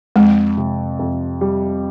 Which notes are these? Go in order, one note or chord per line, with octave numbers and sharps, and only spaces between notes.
F2 G#3
C3
F2
G3